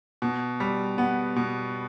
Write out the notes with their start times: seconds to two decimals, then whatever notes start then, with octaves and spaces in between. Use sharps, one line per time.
0.22 B2
0.60 G3
0.98 B3
1.36 B2